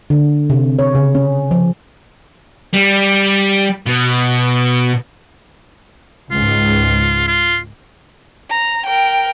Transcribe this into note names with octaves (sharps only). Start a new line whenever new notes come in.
D3
C3
C#5
C#3
C#4
F3
G3
B2
C#2 G#2 F4
F4
A#5
A#4 G5